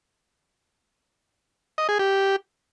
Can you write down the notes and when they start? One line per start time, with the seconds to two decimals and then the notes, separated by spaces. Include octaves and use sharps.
1.78 D#5
1.89 G#4
1.99 G4